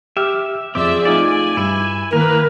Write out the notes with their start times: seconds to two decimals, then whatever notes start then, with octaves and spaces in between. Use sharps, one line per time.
0.17 G4 E5 D6 F6
0.75 F2 C4 G#4 D5 E5 D6
1.05 A3 D#4 F4 D5 G#5
1.57 G2 E4
2.13 D#3 A#3 E4 A#4 B4